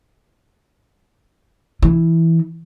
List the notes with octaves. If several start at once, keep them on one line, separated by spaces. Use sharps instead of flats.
E3